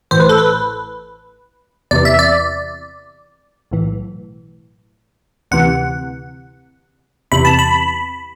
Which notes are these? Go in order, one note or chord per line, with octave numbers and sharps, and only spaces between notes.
A1 A2 E3 C5
B4
A4
B4
E2 C3 E3 D5
E5
D5
B1 A2 E3
D2 C3 E3 F#5
E2 C3 E3 B5
A5
B5